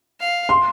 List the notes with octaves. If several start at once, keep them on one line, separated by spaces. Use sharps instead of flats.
F5
C6